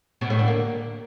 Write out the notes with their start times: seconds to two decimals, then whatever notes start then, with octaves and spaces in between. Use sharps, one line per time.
0.21 B2
0.30 A2
0.39 D3
0.48 A#3